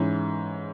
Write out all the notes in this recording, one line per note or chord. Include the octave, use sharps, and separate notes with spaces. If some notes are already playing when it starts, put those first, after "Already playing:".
Already playing: G#2 E3 C#4